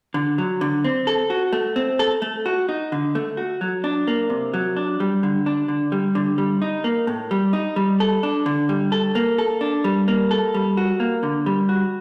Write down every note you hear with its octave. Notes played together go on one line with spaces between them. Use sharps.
D3
F#3
D3
C4
A4
F#4
A3
C4
A4
A3
F#4
D#4
D3
A3
F#4
F#3
D4
A#3
C3
F#3
D4
G3
D3
D4
D3
G3
D3
G3
D#4
A#3
A2
G3
D#4
G3
A4
D4
D3
G3
A4
A#3
A4
D4
G3
A#3
A4
G3
F#4
A#3
D3
G3
F#4